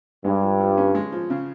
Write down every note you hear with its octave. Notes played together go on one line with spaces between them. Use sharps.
G2 G#3
F3
F3
C#4
G#3
F3
C#3